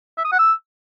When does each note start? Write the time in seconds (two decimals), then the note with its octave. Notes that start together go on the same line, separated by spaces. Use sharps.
0.18 E5
0.25 D#6
0.32 F#5
0.39 E6